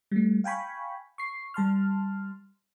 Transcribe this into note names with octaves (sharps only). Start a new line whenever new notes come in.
G3 A3
F5 G5 G#5 B5 C#6
C#6 C7
G3 A5 C6 F6